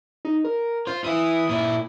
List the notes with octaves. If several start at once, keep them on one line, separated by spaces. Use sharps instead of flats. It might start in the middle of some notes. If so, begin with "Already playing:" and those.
D#4
A#4
F4 C5
E3 E4 D#6
A#2 E4